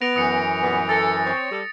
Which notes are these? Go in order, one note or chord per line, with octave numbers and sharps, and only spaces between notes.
B3 A#6 D7 F7
F#2 E3 D#6 C#7
A#2 G3 B3
A4 A6 A#6 C#7
C4 C#5
G3 A4